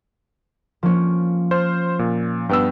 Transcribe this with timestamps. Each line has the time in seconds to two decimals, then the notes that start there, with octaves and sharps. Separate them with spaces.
0.83 F3 A#3 C#4
1.51 C5 F6
1.99 A#2
2.49 G2 B3 G5 E6